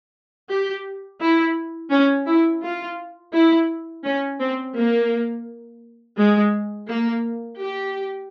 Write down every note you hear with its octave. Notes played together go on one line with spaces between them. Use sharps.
G4
E4
C#4
E4
F4
E4
C#4
C4
A#3
G#3
A#3
G4